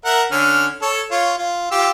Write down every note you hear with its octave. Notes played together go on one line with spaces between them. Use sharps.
A#4 E5 F#5
D3 C#4 F6
A4 C#5
F4 C#5
F4
F4 G4 E6